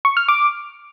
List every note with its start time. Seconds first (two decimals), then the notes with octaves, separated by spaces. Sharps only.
0.05 C#6
0.17 F6
0.28 D6